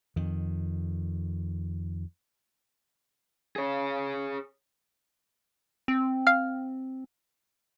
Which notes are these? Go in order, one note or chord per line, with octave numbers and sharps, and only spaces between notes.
F2 D#3
G#4 C#5
C4
F5 F6